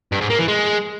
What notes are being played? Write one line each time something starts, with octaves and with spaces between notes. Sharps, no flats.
G2
G#2
A#3
E3
G#3